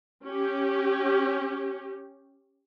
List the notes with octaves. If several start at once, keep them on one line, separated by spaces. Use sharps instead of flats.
C#4 G4